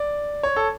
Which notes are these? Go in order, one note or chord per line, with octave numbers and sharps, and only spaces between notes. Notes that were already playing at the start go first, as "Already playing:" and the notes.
Already playing: D5
C#5
A4